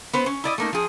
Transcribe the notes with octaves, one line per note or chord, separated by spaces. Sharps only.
B3 B4 C5
C#4
E4 D5 D#5
A3 A#3 D#4
F3 G#4